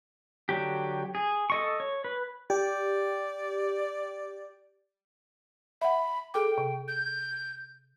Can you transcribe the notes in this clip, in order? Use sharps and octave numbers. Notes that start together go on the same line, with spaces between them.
D3 F#3 G4
G#4
A4 D#5 C#6
C#5
B4
G4 D5
E5 F#5 B5
G#4 A4 G5 D6
C3
G6